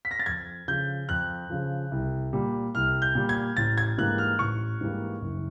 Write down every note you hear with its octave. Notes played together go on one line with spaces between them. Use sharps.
B6
A#6
A6
F2 G#6
C#3 F3 G6
F2 F#6
C#3 F3
C2
A#2 G3
C2 F6
G6
A#2 G3
G#6
A1 A6
G#6
G#2 E3 G3 A#3 F#6
F6
A1 C#6
G#2 E3 G3 A#3
F#1